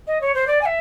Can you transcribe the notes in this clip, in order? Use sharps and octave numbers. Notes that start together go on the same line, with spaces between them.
D#5
C#5
C5
D5
G#5
E5